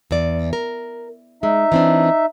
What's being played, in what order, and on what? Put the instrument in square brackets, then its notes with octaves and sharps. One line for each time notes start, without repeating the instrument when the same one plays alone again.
[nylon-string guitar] E2 D5
A#4
[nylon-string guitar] G#3 [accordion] D#4 E5
[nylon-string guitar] E3 C4 D4